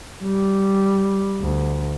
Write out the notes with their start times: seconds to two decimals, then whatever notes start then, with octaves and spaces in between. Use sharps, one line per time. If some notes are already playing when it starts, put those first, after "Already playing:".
0.24 G3
1.41 D2